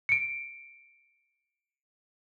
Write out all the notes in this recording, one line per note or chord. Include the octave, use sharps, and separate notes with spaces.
C#7 D7